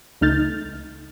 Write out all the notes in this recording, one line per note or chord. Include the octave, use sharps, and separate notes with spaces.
C#2 A3 D#4 F6 G6 A6